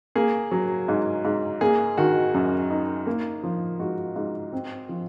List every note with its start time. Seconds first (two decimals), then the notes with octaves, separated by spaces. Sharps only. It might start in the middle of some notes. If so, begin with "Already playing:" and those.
0.16 A#3 G#4
0.51 F#3
0.88 G#2
1.25 G#2
1.61 A#3 G#4
1.98 D#3 F#4
2.34 F#2
2.70 D#4
3.07 A#3
3.43 F3
3.79 G#2 F#4
4.16 G#2
4.53 C4
4.89 F3